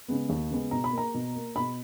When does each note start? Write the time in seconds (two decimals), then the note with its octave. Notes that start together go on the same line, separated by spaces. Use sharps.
0.08 C#3 G#3 B3
0.29 D#2
0.51 C#3 G#3 B3
0.71 B2 A#5
0.84 B5
0.92 A#3
0.98 A#5
1.14 B2
1.35 A#3
1.56 B2 B5